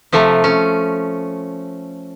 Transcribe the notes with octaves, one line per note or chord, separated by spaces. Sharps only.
C3 F3 A3
C#4